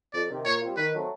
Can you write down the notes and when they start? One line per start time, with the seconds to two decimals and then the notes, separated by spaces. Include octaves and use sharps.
0.13 F2 D5
0.30 C3 D#3
0.45 A#2 C#5
0.61 G3 C4 F4
0.76 D#3 B4
0.93 F#3 A3 C4